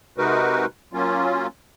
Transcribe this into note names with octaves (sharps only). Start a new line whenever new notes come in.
C3 G#3 D#4 F#4 A#4 B4
F#3 A#3 C#4 F4